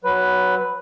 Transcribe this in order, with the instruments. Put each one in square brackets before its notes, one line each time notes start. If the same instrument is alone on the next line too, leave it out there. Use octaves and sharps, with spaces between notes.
[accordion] F#3 B4